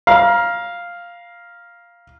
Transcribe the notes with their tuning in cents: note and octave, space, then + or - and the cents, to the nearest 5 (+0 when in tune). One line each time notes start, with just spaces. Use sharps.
F5 +0 A#5 +30